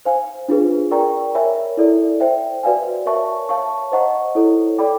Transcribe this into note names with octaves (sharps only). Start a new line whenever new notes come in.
C5 F5 G#5
D4 F4 G#4 B4
A#4 D5 G5 A#5 C#6
A#4 C#5 E5 G#5 B5
E4 A4 D5
C5 E5 G5
F#4 B4 D5 F5 G#5
A#4 C#5 E5 A5 C#6
C#5 F5 A5 C#6
C5 D#5 F#5 A#5 C#6
E4 A4 C#5
A4 D5 G5 B5 D6